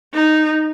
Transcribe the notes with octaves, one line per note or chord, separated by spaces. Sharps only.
D#4